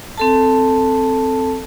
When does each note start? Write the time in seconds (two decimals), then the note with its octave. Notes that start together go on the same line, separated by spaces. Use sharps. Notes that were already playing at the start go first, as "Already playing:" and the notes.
0.18 C4 A4 A5